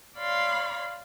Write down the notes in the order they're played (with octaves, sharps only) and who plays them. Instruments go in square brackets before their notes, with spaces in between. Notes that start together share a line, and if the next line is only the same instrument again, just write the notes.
[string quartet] C#5 D5 F5 B5 C6